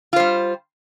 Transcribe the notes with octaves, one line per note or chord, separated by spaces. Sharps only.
G3 F4 C5